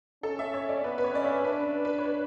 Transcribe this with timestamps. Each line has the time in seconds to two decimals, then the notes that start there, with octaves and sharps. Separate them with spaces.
0.23 C#4 A4
0.39 E5
0.54 C#5
0.69 D5
0.84 B3 B4
0.98 B4
1.04 C#5
1.14 C#4 D5
1.25 E5
1.45 D4 B4
1.85 B4
1.98 C#5
2.05 B4